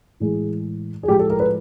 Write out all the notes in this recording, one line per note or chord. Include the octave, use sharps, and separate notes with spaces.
A2 E3 G#3 G#4
G#4
A2 F3 G#3 G4
A4
A#4
B4